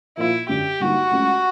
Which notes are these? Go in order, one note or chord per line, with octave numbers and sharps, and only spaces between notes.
A#2 F3 A#3 E4
F#2 D3 F#3 G4
G2 D3 G3 A#3 D#4 F#4
C#2 C#3 F#3 A3 C#4